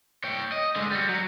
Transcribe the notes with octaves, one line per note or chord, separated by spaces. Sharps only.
C#5 G5
D#5
D3 G#3
G3 F#4
F#3